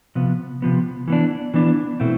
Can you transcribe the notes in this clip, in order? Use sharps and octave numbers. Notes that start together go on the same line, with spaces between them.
C3 F3 B3
C3 F3 B3
E3 B3 D4
E3 B3 D4
B2 A3 C4 E4